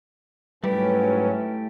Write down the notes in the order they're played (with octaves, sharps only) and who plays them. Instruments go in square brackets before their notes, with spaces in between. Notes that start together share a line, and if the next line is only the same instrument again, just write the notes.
[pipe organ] G#2 F#3 C#4 [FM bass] G3 [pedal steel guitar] A3 E4 G4 [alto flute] B4